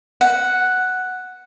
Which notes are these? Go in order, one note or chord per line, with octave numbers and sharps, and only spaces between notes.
F#5